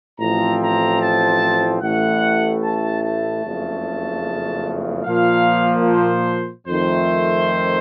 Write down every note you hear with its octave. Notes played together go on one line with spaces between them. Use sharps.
A1 A2 F3 C4 A#5
A#5
A5
A1 A2 A3 F#5
A5
A5
F#1 F2 C#3 A3
A#2 F3 A#3 F5
C5
F2 D#3 A3 C5